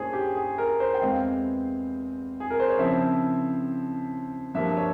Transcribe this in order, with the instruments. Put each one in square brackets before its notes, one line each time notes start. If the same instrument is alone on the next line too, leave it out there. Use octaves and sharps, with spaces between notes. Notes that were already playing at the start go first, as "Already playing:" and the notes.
Already playing: [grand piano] G2 A#3 C#4 E4 G#4 C5 C#5
G4
G#4
A#4
C5
G5
E2 E3 G#3 C4 F5
G#4
A#4
C5
C#5
C#3 F3 C4 E4 E5
G2 F3 A#3 E5
C#5